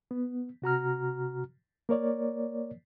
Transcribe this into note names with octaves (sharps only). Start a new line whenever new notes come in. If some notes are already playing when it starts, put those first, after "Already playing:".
B3
C3 F#4 A#5 F6
A#3 A#4 C#5 D5